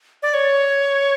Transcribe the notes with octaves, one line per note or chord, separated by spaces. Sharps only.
D5
C#5